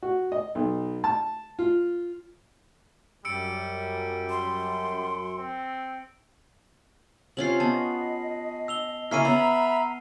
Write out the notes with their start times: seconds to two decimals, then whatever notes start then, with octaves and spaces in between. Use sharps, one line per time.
0.03 F#4
0.32 D#5
0.55 B1
1.04 A5
1.59 F4
3.25 F#2 G3 E6 C#7 D7
4.30 C6
5.38 C4
7.37 C3 C#4 F4 C7 F#7
7.60 B3 D#5 A5
8.68 E6 F7 G7
9.11 C#3 A#3 C#4 E4 B5 F6 C7 D#7
9.25 B3 E5 A#5 B5